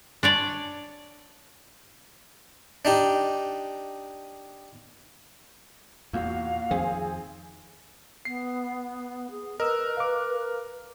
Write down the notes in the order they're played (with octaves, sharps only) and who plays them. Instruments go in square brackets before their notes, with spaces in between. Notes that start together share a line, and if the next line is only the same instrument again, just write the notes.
[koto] D4 C#5 D5
[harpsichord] D4 D#4 G4
[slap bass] E2 [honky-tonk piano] A#2 F#4 [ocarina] F5
[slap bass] F2 D#3 [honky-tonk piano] C4 G#4
[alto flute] B3 [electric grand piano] C7
[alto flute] G#4
[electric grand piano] A#4 [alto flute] B4 [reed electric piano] D#5 E6
[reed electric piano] F5 D6